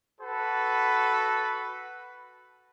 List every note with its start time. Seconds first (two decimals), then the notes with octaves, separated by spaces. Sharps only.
0.21 F#4 A4 B4